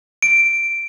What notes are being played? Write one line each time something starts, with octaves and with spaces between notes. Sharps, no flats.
D7